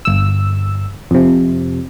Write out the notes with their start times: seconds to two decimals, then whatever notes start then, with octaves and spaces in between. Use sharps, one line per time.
0.05 G1 E6
1.11 F2 C3